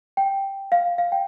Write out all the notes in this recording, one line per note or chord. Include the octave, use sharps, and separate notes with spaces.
G5
F5
F5
G5